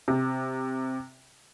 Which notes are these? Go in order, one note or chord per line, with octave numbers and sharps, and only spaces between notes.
C3